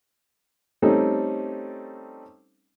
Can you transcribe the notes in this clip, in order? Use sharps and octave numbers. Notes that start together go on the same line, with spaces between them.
G3 A3 C4 C#4 D#4 A4